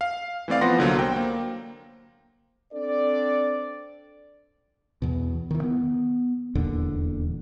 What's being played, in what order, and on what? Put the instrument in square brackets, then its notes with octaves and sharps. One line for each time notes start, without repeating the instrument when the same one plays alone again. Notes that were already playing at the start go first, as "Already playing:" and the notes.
[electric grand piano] F5
E3 A3 C4 D5 F5
F3 B3 B4 F#5 C6 A#6
C2 D3 F#3 A#3
C5 G5
A#3
[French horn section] C4 D4 A4 D5
[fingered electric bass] E2 B2
D#3 E3
B3
D#1 E2 A#2 D3